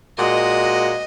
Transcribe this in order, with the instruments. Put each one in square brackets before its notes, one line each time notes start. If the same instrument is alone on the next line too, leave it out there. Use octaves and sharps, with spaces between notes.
[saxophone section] A#2 G#3 F#4 [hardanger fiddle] D#5